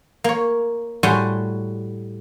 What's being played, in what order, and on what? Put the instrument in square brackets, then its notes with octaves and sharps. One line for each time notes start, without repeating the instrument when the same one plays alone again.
[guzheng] A#3 C#5
A2 G3 F#4 C#5 G#5 C6